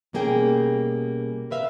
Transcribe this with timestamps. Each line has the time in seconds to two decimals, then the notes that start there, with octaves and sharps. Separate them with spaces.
0.13 B2 G3 A#3 C#4 G#4 G5
1.51 A#4 B4 E5 F5